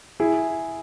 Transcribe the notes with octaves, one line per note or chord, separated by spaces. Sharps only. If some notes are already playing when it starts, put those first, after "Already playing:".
E4 G#4